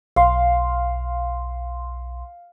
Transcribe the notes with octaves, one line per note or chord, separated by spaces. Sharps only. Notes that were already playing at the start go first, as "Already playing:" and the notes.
B1 F5 C6